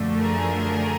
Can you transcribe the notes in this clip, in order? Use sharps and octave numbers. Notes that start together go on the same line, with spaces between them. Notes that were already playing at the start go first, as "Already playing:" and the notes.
Already playing: F#2 D3 F3 A3
G#4 A#4